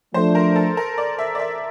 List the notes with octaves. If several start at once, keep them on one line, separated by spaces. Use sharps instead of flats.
F3 A3 D4 C5
A#4
A4
A#4
D5
E5
D5
E5